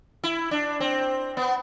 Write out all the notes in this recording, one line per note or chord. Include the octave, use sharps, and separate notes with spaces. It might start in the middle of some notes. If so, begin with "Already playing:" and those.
E4
D4
C4
B3